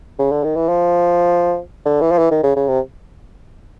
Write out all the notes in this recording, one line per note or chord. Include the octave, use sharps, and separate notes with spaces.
C#3
D3
D#3
E3
F3
D3
E3
F3
E3
D#3
C#3
C#3
C3